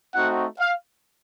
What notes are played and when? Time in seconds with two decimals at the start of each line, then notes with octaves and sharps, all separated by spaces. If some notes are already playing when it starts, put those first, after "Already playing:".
0.15 A3 C4 D#4 F#4 F#5
0.58 F5